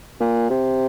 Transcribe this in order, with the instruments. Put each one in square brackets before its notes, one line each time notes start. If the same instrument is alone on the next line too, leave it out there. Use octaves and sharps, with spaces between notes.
[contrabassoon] A#2
C3